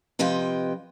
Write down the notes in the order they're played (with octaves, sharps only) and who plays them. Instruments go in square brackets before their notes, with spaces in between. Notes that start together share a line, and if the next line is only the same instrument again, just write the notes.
[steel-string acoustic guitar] C3 F3 B4 D#5 G5